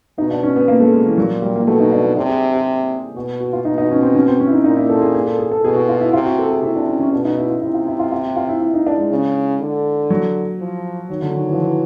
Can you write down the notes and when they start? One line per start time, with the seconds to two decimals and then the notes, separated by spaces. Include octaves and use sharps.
0.18 B2 D#4
0.31 D4
0.43 C#4
0.56 B3
0.68 B2 A#3
0.80 A3
0.92 G#3
1.06 E3
1.18 A#2 F#3
1.42 G3
1.56 A#3
1.67 B2 A3
1.80 D#4
1.92 D4
2.04 D#4
2.17 C3 D4
2.29 G#4
2.54 G4
3.15 B2 F#4
3.41 F#4
3.53 F4
3.65 B2 D#4
3.78 D#4
3.91 C#4
4.02 C4
4.15 C#4
4.28 C4
4.40 C#4
4.47 E4
4.52 D#4
4.64 A#2 D#4
4.77 E4
4.89 A4
5.02 G#4
5.15 G#4
5.26 A4
5.39 G#4
5.51 A4
5.64 B2 G#4
5.76 F#4
5.89 F4
6.01 E4
6.13 C3 F4
6.26 F#4
6.39 A4
6.51 G#4
6.63 C3 E4
6.76 D4
6.88 C#4
7.00 C#4
7.12 B2 D4
7.25 D#4
7.38 E4
7.49 F4
7.62 C3 E4
7.74 F4
7.88 E4
7.99 F4
8.12 F4
8.25 G4
8.36 F4
8.49 E4
8.61 E4
8.74 D#4
8.87 D4
8.98 G#3
9.11 C#3
9.61 D3
10.10 F#3
10.59 F3
11.10 D#3 F#3
11.22 D3
11.34 D#3
11.47 E3
11.54 F3
11.62 E3